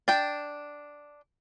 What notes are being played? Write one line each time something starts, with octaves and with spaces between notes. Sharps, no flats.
D4 G5